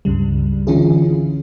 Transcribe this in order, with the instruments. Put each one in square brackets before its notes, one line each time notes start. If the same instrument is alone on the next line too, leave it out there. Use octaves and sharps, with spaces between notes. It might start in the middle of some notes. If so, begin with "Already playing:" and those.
[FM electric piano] C#2 G2 C#3 G3
D3 E3 C#4 E4 F4 G#4